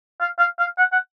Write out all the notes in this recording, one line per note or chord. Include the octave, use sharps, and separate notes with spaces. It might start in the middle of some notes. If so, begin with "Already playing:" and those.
F5
F5
F5
F#5
F#5